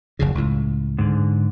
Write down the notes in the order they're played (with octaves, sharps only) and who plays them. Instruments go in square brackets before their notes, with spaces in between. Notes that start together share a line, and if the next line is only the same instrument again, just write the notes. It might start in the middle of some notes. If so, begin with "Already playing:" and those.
[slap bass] F#1 F2 C#3
C#2 A2
[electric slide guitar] G#2 D3